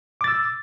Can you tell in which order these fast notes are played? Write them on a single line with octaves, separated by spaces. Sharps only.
D6 A6 E6